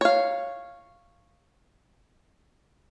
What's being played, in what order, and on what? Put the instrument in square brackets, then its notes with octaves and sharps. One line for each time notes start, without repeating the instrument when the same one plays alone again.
[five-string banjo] C#5 F5